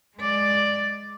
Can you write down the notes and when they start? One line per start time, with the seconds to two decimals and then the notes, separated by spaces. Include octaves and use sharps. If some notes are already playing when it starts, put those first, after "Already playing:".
0.17 G#3 D5